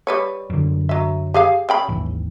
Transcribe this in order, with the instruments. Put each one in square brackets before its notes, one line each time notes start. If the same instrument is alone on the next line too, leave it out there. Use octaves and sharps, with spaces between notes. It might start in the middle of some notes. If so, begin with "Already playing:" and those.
[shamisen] G3 B4 C#5
[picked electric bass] F#2 D3
[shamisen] F#3 E5
G4 G#4 F5
C#3 G5 B5
[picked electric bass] G#1 D#2 E3